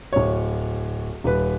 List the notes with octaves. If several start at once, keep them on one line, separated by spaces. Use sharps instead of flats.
D1 C#5
D#1 B4